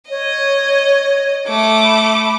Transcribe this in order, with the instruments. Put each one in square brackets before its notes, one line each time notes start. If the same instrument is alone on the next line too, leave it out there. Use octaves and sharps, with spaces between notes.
[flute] C#5 [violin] D#5
[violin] A3 D6
[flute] B5